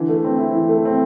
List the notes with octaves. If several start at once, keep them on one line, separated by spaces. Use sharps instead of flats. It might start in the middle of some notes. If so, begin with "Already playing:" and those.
Already playing: D3 E3
A3
C4
E4
E3
A3
C4